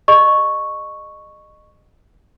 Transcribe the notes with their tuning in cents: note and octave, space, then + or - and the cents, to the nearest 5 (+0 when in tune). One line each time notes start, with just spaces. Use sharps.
G#4 +0 D#5 -25 C#6 +0